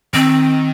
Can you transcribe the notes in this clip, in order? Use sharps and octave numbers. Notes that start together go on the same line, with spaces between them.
D#3 C4